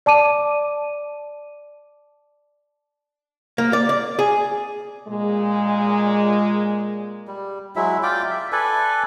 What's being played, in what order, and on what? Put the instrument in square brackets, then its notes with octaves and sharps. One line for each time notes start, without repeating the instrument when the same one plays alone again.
[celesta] D5 A5 D6 D#7
[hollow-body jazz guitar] A#3
D5
D5
G#4
[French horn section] A#2 G#3
[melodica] G3
F#3 G#3 E4 E5
F4 D5 G5 D6
E5
A4 B4 D5 G#5